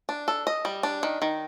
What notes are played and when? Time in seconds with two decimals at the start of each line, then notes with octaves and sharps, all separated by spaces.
0.09 D4
0.28 A4
0.47 D#5
0.65 G3
0.83 D4
1.03 D#3
1.22 D#3